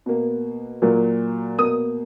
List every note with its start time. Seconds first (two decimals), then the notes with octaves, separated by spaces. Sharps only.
0.06 B2 A#3
0.82 A#2 F#3 A#3
1.58 B2 A#3 D#6